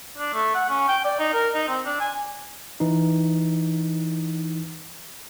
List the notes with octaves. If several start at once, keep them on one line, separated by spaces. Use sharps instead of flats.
D4
A3
F#5
C#4
G5
D5
D#4
A#4
D#4
C4
D4
G#5
E3 D#4